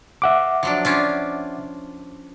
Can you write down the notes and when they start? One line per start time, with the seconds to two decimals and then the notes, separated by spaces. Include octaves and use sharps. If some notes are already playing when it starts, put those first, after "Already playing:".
0.22 E5 F#5 D6
0.63 F3 F#3 D4
0.85 C#4 D4 F4